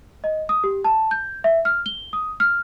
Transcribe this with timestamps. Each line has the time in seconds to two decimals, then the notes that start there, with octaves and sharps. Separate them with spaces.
0.24 D#5
0.49 D#6
0.64 G4
0.84 A5
1.11 G6
1.44 E5
1.65 F6
1.86 G7
2.13 D#6
2.40 F6